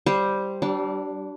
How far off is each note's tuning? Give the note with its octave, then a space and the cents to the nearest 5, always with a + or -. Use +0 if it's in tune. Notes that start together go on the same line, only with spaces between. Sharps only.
G3 +0 C5 +0
G3 -35 D4 +0